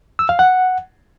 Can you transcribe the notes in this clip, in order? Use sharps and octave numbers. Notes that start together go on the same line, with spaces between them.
E6
F5
F#5